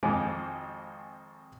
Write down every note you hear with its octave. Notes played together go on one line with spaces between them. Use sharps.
G#1 F2 F3 G#3 G#4 D6